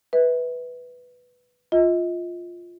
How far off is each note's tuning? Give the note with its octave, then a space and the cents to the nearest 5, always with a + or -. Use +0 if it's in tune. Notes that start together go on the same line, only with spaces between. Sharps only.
B4 +0 E5 -30
F4 +0 D#5 +35